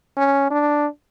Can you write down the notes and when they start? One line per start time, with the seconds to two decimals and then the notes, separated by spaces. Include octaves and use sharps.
0.17 C#4
0.51 D4